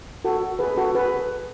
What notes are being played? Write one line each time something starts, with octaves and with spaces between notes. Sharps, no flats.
F#4 A4
G#4 B4
F#4 A4
G#4 B4